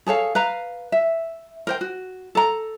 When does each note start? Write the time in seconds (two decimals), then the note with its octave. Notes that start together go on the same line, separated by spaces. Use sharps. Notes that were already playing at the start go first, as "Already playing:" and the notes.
0.06 G#4 A4 C#5 F5
0.35 B4 F5 A#5
0.92 E5
1.67 A#4 C5 G5
1.81 F#4
2.35 A4 A#5